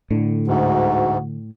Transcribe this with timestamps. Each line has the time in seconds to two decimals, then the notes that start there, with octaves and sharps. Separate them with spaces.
0.10 A2 D3
0.47 D2 G#2 F#4